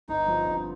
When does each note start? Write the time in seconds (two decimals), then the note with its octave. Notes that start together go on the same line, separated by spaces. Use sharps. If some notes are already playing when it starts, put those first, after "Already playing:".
0.08 G1 D#4
0.27 G2 F3 C4 F4
0.46 G1